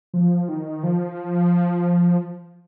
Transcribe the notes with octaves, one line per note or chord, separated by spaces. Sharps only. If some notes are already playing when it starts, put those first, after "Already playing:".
F3
D#3
F3